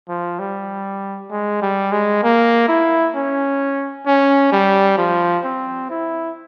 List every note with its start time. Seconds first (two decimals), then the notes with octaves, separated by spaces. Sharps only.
0.09 F3
0.39 G3
1.31 G#3
1.62 G3
1.92 G#3
2.23 A#3
2.68 E4
3.15 C#4
4.06 C#4
4.52 G3
4.98 F3
5.44 C4
5.90 E4